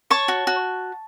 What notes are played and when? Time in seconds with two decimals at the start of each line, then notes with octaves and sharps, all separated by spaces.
0.10 C#5 A5 C#6
0.28 F#4
0.47 F#4